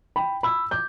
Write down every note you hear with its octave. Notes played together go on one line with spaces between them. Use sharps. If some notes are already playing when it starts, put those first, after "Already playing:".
G5 B5
B5 E6
D6 G6